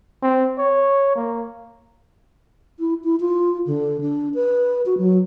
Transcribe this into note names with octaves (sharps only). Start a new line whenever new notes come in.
C4
C#5
A#3
E4
E4
F4
D3
D4
B4
F#4
F#3